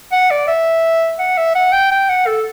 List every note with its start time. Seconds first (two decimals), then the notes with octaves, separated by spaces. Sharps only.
0.12 F#5
0.31 D5
0.48 E5
1.19 F#5
1.37 E5
1.55 F#5
1.72 G5
1.91 G5
2.09 F#5
2.27 A4